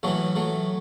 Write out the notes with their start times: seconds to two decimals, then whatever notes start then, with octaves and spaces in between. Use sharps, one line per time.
0.03 A1 A2 E3 F#3 A3
0.36 F#3 A3